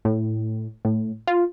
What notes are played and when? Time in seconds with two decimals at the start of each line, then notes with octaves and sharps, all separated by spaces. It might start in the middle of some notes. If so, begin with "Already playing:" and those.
0.05 A2
0.85 A2
1.27 F4